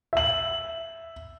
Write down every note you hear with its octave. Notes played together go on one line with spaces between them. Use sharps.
E5 F#7